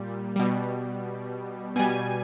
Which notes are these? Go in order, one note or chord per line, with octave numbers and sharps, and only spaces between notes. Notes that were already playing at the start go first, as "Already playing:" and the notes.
Already playing: A#2 G3
B2 G3
B2 G3 G#5